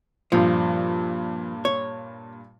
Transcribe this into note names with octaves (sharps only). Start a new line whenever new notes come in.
G2 A#2 F3
C#5